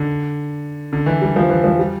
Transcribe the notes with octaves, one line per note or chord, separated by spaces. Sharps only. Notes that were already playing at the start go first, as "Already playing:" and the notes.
Already playing: D3
D3
E3
G3
F3
E3
F3
G3